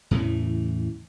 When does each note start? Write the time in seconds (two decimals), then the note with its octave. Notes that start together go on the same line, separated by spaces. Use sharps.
0.11 E2 A2 C#3 E3